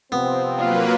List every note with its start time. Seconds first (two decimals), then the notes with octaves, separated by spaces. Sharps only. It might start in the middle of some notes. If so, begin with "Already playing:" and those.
0.12 C3 F3 B3 C4
0.58 F#3 A#3 F4 B4